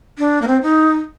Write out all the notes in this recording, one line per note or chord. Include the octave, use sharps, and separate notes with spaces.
D4
A#3
C4
D#4